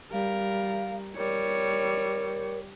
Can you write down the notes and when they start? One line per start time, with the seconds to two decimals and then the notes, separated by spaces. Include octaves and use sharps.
0.12 G3 A#4 F5
1.17 G3 A#4 C#5